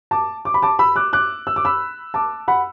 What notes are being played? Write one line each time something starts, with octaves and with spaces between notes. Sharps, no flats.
A5 D6
D6
B5
A5 D6
B5 E6
D6 F#6
D6 F#6
E6
D6
B5 E6
A5 D6
F#5 B5